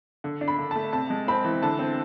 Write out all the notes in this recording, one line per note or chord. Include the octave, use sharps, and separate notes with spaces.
D3
D4
B5
D3
A3 A5
C3 A5
G#3
C4 B5
E3
D3 A5
C4